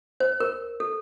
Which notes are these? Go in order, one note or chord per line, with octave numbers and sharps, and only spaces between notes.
C5
A#4
A4